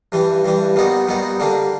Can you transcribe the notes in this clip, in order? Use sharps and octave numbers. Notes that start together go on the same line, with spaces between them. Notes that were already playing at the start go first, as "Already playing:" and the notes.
G2 E3 G3
G2 E3 G3
A#2 G3 B3 D#4 F#4
A#2 G3 B3 D#4 F#4
D3 G3 A#3 D4